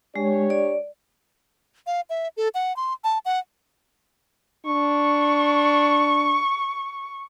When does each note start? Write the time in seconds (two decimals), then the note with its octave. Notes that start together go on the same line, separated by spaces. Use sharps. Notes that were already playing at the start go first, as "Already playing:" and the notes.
0.16 G#3 D4 G4 C#5
0.50 D5
1.87 F5
2.10 E5
2.37 A4
2.54 F#5
2.76 C6
3.04 A5
3.25 F#5
4.65 D4 C#6